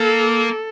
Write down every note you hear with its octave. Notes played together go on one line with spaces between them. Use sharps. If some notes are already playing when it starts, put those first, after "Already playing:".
Already playing: A#3 A4